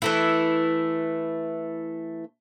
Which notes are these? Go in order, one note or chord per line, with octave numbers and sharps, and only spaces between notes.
E3 A3 E4